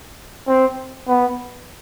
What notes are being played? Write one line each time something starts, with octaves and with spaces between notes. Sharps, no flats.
C4
B3